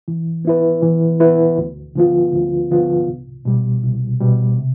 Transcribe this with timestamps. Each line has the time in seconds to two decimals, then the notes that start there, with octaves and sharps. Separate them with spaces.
0.08 E3
0.45 B3 E4 B4
0.83 E3
1.20 B3 E4 B4
1.58 D2
1.95 D3 F3 B3 F4
2.33 D2
2.71 D3 F3 B3 F4
3.08 C2
3.45 B2 G3
3.83 C2
4.21 B2 G3
4.58 C3